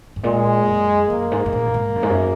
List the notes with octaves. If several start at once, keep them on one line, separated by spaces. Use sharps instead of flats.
G#2
A#2 G#3
F#2
F#2 A#3
G#2
G#2
A#2
F#2
G#2
F#2
G#2
F#2